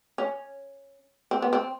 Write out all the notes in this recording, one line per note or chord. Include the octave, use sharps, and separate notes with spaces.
C#4
C4
B3
C4